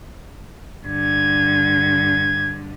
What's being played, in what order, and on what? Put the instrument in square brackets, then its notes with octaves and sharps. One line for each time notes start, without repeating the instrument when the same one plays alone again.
[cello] G2 D3 [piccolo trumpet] G#6